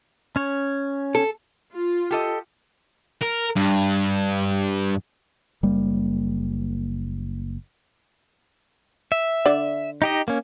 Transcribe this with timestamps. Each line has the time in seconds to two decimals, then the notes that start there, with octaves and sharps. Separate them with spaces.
0.36 C#4 C#5
1.15 A4
1.73 F4
2.11 G4 A4 D#5
3.22 A#4
3.56 G2
5.63 F#1 G3 A#3
9.12 E5
9.46 D3 D5
10.02 D#4 G4 D#5
10.28 A#3 C#4